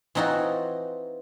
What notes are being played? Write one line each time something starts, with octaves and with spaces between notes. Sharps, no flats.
E3 C4 D#4 F4 F#4